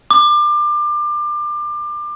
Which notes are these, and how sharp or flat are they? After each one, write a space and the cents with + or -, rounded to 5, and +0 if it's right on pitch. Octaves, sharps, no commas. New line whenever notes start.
D6 +30